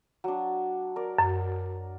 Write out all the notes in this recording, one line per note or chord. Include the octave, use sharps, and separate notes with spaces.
F#3 D4
A#4 D5
F#2